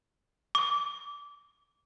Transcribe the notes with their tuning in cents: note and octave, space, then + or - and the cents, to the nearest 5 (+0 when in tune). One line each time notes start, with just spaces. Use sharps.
D6 -20